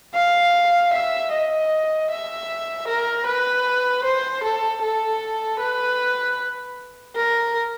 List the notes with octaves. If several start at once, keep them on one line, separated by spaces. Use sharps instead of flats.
F5
E5
D#5
E5
A#4
B4
C5
A4
A4
B4
A#4